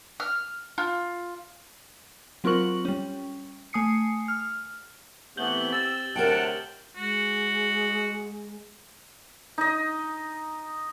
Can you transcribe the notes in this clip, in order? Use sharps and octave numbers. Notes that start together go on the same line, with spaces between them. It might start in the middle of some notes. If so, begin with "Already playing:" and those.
F6
F4
F#3 C4 F4 A#4 C#6 F#7
G3 C#4
A3 G#5 D#6 C7 C#7
F6
E3 A3 B3 C4 G4 G6 F#7 G7
E6 A6
D2 C3 A#4 C#5 F#5 G5 A5
G#3 F#4
D#4 D#5